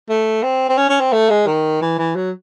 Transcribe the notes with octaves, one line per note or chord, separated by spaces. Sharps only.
A3
C4
C4
C#4
C#4
C4
A3
G#3
D#3
E3
E3
F#3